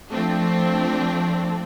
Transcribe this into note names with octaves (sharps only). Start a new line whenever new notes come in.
F3 A3 C4 D4